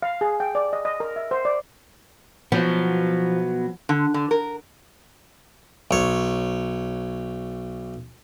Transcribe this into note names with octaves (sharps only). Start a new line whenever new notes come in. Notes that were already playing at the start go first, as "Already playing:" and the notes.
F5
G#4
G5
D5
D#5
D#5
A#4
E5
C5
D5
B2 F3 F#3 B3
D3
D3
A#4
B1 C#5